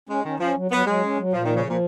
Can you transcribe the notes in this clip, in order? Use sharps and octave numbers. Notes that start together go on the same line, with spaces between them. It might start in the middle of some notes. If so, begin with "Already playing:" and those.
G#3 C#4
D#3 C#4
F3 C#4
F#3
F#3 B3
F#3 G#3
C#4
F#3
A#2 F3
D#3
F3
C#3
A#2 F3